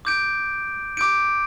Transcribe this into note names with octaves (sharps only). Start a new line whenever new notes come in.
D6 G6 D7
D6 G6 D7